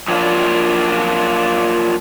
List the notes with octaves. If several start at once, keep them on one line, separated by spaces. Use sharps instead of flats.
F3 F#3 A#3 D4 F4